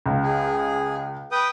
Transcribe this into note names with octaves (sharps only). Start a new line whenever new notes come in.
C#2
G#4
B4 G5 D#6